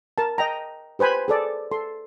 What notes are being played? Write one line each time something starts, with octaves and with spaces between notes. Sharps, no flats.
A#4 A5
D#5 G5 A#5
G4 B4 C5 G#5 B5
G#4 A4 D5
A4 C6